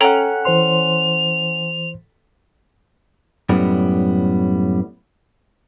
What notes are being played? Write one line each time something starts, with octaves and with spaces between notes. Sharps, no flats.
C#4 A4 F#5 G5 A#5
E3 C5 C6 F7
F#2 A2 G3 B3